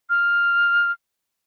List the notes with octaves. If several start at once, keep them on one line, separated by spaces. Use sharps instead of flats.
F6